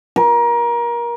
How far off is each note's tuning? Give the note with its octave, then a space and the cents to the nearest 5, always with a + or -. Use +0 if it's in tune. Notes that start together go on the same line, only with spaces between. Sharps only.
A#4 +25